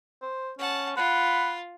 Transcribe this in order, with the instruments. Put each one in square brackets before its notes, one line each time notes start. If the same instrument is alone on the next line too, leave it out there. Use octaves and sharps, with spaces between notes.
[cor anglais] C5
[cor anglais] C#4 [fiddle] F#5 A5
[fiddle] F4 [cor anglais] F#5 [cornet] B5